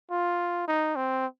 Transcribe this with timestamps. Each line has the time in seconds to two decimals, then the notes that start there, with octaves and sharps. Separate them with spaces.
0.11 F4
0.68 D#4
0.96 C4